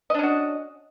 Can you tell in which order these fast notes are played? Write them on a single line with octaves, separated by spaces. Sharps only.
D#5 D4 C#4 F#4